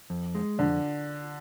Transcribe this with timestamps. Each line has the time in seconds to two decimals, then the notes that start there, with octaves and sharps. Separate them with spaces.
0.10 F2
0.35 G#3
0.58 F2 D3